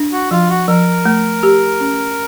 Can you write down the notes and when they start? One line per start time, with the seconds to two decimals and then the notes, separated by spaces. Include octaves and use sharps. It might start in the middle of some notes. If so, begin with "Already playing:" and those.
Already playing: D4
0.12 F#4
0.31 F3 F4
0.49 F#4
0.68 F3 A#4
1.05 A3
1.43 G4
1.80 C#4